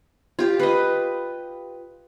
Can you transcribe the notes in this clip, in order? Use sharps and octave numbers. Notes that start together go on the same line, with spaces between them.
F4 G4
B4 D#5